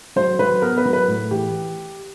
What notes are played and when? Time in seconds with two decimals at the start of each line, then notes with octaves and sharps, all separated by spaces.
0.16 F#3 C5
0.39 F#3 B4
0.62 B3 A#4
0.78 B4
0.85 F#3
0.93 B4
1.08 A2
1.31 E3 G4